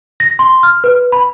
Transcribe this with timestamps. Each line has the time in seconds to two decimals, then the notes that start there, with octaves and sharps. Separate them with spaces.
0.20 A#6
0.39 C6
0.63 F6
0.84 B4
1.12 B5